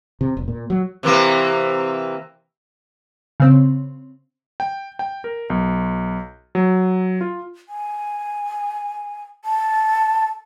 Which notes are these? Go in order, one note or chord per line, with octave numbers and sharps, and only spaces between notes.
C3
E1
A#2
F#3
C3 E3 A#3
C#3 C4
G5
G5
A#4
B1
F#3
F4
G#5
A5